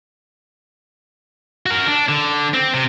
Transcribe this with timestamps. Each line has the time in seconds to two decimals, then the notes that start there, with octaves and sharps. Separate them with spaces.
1.66 F#4 A#4
1.87 D4
2.08 D3
2.54 C4
2.74 C3